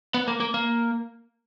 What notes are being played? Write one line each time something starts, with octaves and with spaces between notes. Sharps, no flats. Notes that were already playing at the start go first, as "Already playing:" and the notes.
B3
A#3
A#3
A#3